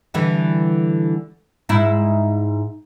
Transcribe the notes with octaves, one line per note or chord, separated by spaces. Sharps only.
D3 E3 G3
G#2 E4